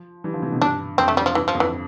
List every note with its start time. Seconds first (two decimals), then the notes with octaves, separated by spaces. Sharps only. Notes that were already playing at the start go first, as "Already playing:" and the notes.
Already playing: F3
0.24 E3 G3
0.34 D3 F3
0.42 C3 E3
0.52 B2 D3
0.61 G2 D4
0.98 F2 C4
1.08 A3
1.17 G3
1.26 F3
1.35 G2 E3
1.48 F3
1.55 F2
1.60 E3